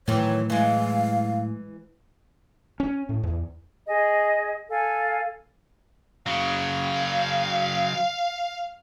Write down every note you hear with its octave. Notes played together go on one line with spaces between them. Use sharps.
A2 D#3 E3 F#3 C#5
E3 G#3 F5
C#4
A2
E2
G#4 D#5
A4 F5 G#5
C#3 F#3 F5